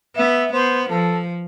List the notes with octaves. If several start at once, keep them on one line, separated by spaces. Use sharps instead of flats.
B3 E5
B3 C5
F3 A4